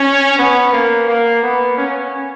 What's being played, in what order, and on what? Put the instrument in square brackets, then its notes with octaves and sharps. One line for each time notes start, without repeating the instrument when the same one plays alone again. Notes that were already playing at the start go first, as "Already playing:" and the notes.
Already playing: [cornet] C#4
B3
A#3
A#3
B3
C#4